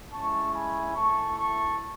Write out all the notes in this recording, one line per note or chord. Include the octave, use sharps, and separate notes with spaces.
G#3 C#4 E4 A5 C#6
G#5 B5
A3 E4 A5 C#6
A5 C#6